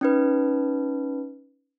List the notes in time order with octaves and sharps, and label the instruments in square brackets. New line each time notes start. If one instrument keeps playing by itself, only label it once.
[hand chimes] C#4 D#4 B4